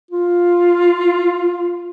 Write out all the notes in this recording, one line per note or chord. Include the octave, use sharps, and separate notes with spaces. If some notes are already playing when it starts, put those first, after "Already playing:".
F4